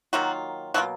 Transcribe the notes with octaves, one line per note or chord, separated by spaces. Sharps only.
D#3 F#3 A#3 F4 F#4
B2 F#3 A#3 F4 F#4